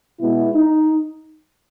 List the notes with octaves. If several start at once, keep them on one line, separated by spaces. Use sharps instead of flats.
B2 G#3 B3 E4
D#4